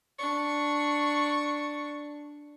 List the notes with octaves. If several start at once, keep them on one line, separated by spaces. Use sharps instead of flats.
D4 C#6